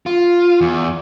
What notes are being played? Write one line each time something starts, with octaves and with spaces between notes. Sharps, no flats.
F4
E2